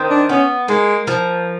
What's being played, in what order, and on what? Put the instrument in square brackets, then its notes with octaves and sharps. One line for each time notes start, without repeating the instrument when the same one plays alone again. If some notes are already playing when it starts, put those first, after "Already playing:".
Already playing: [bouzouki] D#3 C4
[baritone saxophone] D4
[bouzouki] B3 [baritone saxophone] C#4
[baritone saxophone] G#3 [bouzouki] A#3
[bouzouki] F3